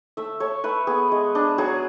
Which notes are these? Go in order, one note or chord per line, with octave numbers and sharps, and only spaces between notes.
A3 E5
A3 C#5
A3 B4
B3 G#4
G#3
D4
F#3 G#4